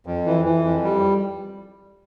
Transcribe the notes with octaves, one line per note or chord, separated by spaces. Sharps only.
F2
E3
E3
F2
G3